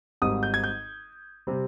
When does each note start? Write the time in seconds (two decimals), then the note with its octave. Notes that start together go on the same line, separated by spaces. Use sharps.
0.22 G#1 G#2 G3 D#6
0.43 G6
0.54 G#6
0.64 G6
1.47 C3 G3 C4